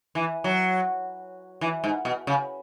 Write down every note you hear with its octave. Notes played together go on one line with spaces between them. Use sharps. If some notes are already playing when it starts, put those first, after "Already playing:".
E3
F#3
E3
G#2
B2
C#3